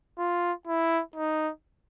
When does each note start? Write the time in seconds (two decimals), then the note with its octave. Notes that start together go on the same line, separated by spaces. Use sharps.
0.18 F4
0.67 E4
1.16 D#4